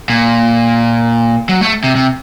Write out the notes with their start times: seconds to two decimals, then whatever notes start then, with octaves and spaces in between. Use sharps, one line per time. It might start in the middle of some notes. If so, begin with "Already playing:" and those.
0.10 A#2
1.49 F#3
1.61 A3
1.84 C3
1.95 C3